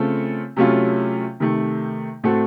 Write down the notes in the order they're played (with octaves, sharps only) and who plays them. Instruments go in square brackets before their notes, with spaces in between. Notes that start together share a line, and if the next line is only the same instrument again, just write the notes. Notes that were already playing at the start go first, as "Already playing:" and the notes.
Already playing: [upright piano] C#3 A3 C4 F4 A4
C3 F#3 A3 C#4 F4
C3 D#3 A3
A2 A3 C4 F#4 A4